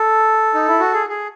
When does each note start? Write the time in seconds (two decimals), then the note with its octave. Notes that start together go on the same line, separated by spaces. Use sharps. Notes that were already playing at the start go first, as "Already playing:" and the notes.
Already playing: A4
0.54 D#4
0.68 E4
0.80 F#4
0.93 G#4
1.09 G#4